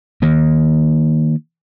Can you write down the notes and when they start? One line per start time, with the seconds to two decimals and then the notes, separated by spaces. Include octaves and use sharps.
0.22 D#3 A#3